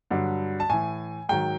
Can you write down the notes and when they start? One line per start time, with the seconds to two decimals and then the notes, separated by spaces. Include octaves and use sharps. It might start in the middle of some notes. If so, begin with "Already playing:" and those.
0.11 G2 D3 F#3
0.60 A5
0.69 A2 E3 G#5
1.29 G#2 D#3 F#3 G5